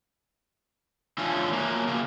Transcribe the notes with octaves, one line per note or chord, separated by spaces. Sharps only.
D3 F3 C#4 E4 F4
F#3 A#3
C#3 A#3